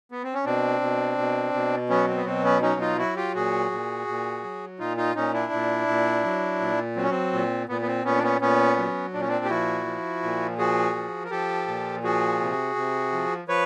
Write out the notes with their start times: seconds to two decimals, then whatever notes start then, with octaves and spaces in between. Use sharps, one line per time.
0.12 B3
0.23 C4
0.34 C#4
0.45 B2 C4 D4
0.81 B2
1.18 B2
1.53 B2
1.89 F#3 B3 C#4
2.09 C4
2.17 B3
2.25 B2 C4
2.44 B3 C#4
2.62 F#3 C#4 D#4
2.81 D#4 F4
2.98 F#3 E4 F#4
3.16 F4 G4
3.35 A#2 F#4 G#4
3.71 A#2
4.08 A#2
4.43 F#3
4.79 A#2 D#4 F4
4.97 D#4 F4
5.15 A#2 C#4 D#4
5.33 D4 E4
5.52 A#2
5.88 A#2
6.24 F#3
6.60 A#2
6.96 F#3 C4
7.03 C#4
7.11 C4
7.33 A#2
7.68 A#2 B3
7.81 B3
7.87 C4
8.05 A#2 B3 C#4
8.17 D4
8.23 B3 C#4
8.41 A#2 B3 C#4
8.78 F#3
9.13 A#2 D4
9.21 C#4
9.28 C4 D4
9.45 G4
9.49 F3 E4 F#4
9.86 F3
10.23 A#2
10.58 F3 F#4 G#4
10.95 F3
11.25 A#4
11.30 F3 G4 A4
11.67 A#2
12.03 F3 F#4 G#4
12.40 C3
12.76 C3
13.12 F3
13.48 F3 B4 C#5